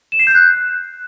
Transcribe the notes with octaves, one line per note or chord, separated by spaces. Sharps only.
E7
C7
G6
F#6